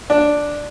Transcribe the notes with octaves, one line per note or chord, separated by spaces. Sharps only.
D4